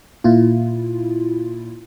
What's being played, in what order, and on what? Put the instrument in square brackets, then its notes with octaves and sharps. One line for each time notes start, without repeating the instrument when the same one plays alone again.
[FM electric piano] A#2 E4 F4